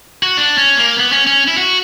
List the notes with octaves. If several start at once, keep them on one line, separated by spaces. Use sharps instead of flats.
F#4
D4
C#4
A#3
B3
C#4
C#4
E4
F#4